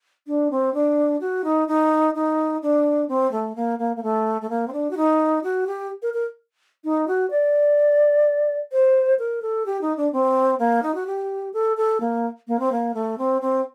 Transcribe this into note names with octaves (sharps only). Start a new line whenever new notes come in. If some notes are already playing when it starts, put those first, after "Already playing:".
D4
C4
D4
F#4
D#4
D#4
D#4
D4
C4
A3
A#3
A#3
A#3
A3
A3
A#3
C4
D4
F#4
D#4
F#4
G4
A#4
A#4
D#4
F#4
D5
C5
A#4
A4
G4
D#4
D4
C4
A#3
D#4
F#4
G4
A4
A4
A#3
A#3
C4
A#3
A3
C4
C4